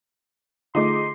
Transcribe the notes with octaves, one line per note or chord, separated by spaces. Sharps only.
D3 A3 D#4 F4 G#4 C6 D6